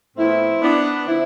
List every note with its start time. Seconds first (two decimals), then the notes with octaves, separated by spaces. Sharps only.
0.16 A2 F3 B3 C4 E4
0.61 B3 D4
1.06 D3 F3 C4 E4